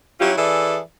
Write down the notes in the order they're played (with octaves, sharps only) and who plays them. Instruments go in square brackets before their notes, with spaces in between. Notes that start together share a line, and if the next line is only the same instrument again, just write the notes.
[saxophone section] F#3 C#4 E4 F4 G4
E3 G#4 A4 D5 E5